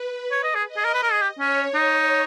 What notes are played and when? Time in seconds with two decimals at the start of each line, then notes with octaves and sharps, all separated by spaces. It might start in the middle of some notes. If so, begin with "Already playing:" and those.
Already playing: B4
0.31 C#5
0.44 D#5
0.55 G#4
0.67 D#5
0.77 G#4
0.85 A#4
0.94 B4
1.03 A#4
1.12 G#4
1.22 G4
1.39 C#4 C#5
1.74 D#4